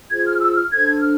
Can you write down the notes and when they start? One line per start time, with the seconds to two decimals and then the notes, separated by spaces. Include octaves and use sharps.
0.11 F4 G#4 C5 G#6
0.25 F6
0.40 E6
0.55 F6
0.70 D4 A4 C5 G#6
0.99 F6